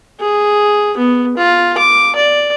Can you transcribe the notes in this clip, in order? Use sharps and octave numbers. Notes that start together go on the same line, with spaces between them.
G#4
B3
F4
D6
D5